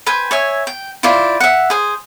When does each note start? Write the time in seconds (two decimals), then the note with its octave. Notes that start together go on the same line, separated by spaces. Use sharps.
0.06 B4 C5 G5 G#5
0.31 C#5 E5 G#5
0.67 G5
1.03 E4 F4 C5 D5
1.40 E5 F#5
1.70 G#4 C5